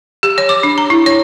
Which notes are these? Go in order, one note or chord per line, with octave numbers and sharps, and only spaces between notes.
G4
C#5
D6
D4
A#5
E4
C#5